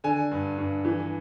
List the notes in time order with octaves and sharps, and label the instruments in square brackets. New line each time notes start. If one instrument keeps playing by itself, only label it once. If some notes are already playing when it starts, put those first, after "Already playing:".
[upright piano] D3 G#5
G2
G2
E3